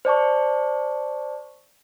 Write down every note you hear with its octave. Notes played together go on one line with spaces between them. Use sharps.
C5 D5 A5 C#6